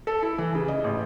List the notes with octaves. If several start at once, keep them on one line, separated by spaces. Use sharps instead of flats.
A4
E4
E3
C#3
D#5
A1